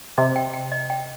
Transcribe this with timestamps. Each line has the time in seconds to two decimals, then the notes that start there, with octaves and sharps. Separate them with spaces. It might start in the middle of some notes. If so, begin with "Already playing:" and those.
0.18 C3 D#5
0.36 G5
0.54 G5
0.72 D#5
0.90 G5